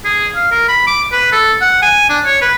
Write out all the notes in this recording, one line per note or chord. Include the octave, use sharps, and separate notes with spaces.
G#4
F5
A#4
B5
D6
B4
A4
F#5
G#5
D4
C#5
B4